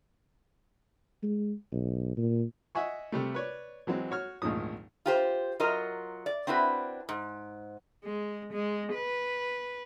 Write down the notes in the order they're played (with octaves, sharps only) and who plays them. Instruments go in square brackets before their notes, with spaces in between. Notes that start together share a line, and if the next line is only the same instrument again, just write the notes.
[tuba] G#3
B1
A#2
[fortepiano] D#5 E5 F#5 G#5 C#6
C3 G3 A3
B4 C#5 D5
E3 F#3 G#3 C4
F#4 C#5 F6
G#1 D2 A#2 D#3 F3 D#6
[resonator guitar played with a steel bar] F4 G4 C5
F#3 F4 A#4 D#5
D5
C4 D4 E4 F#4 B4
G#2
[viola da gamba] G#3
G#3
B4